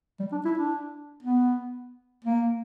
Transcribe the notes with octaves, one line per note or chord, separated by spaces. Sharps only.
G3
D4
E4
D4
B3
A#3